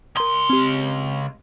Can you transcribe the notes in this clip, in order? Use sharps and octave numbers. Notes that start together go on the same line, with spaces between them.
C#2 A#4 A#5 C6 D#6
C4 G4